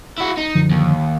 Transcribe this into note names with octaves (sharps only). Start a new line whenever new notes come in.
E4 F#4
D#4
F#2 D3 F3
D#2